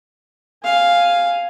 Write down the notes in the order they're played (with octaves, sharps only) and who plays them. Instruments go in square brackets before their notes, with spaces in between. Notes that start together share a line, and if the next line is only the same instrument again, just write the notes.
[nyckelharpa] F5 G#5